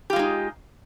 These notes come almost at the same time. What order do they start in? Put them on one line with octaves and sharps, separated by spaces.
G4 F4 G#3 D#4